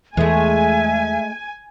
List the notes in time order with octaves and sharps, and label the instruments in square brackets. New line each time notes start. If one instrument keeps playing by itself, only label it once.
[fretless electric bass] E2 E3 [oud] G#3 A3 [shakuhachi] E5 [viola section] G#5